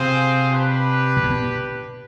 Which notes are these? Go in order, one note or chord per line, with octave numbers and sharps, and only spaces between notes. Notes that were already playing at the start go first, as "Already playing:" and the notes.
Already playing: C3 C4 F4 G#4 C5
D4 G4 B4
B2
G#2
B2